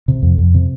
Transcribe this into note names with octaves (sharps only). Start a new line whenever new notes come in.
C3
F2
F2
C3